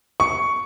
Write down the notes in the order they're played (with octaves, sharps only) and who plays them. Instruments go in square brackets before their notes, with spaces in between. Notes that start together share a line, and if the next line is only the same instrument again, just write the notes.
[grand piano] C#6